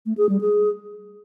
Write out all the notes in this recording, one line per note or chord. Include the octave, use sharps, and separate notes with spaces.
A3
G#4
G3
G#4